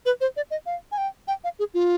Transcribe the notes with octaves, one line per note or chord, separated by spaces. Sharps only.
B4
C5
D5
D#5
F5
G#5
G5
G5
F5
G#4
F4